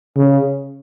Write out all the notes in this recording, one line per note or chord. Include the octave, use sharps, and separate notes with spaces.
C#3